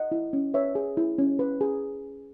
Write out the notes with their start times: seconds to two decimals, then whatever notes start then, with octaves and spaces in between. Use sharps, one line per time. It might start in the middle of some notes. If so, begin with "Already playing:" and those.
Already playing: D#5 F#5
0.12 E4
0.33 C#4
0.54 B4 C#5 E5
0.75 G#4
0.97 E4
1.18 C#4
1.39 B4
1.61 G#4